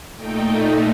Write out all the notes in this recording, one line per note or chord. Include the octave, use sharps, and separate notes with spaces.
A#2 A3 D#4 G5